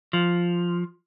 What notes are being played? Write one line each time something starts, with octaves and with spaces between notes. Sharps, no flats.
F3